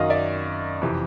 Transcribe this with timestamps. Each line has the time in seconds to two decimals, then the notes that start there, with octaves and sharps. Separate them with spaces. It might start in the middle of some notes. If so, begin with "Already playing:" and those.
Already playing: F#2 D#3 D#5 F5
0.10 D5 E5
0.82 F2 C3 E3